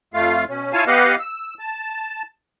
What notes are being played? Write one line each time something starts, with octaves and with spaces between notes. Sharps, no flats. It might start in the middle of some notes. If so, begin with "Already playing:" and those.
F2 A3 F4 F5
B2 C#4
E4 F4 C#5 F5 G#5 A5
B3 G4 B4 D#5 F5 F#5
E6
A5